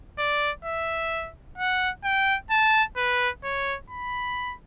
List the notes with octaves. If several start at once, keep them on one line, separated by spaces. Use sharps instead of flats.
D5
E5
F#5
G5
A5
B4
C#5
B5